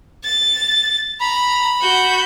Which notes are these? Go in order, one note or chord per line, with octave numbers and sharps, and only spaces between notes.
A6
A#5 B5
F#4 G6